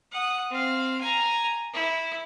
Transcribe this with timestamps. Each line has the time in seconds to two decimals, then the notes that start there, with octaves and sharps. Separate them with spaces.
0.12 F#5 D#6
0.51 C4 F5
1.01 G#5 A#5
1.74 E4